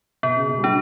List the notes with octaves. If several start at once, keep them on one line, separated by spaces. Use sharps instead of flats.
B2 B3
C#3
B2
G3
F#3 D4